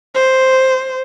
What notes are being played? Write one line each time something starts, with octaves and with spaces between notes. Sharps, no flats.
C5